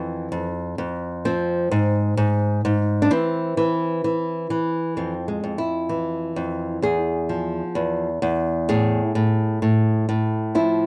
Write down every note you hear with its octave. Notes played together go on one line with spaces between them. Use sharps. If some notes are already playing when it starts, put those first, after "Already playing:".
Already playing: F2 E3
F2
F2
F3 C4
G#2
G#2
G#2
D4
E3 C4
E3
E3
E3
F2 C4
G#3
F2
E4
E3
F2
E2 G#4
F3
E2
E2
A2 G#4
A2
A2
A2
F3 E4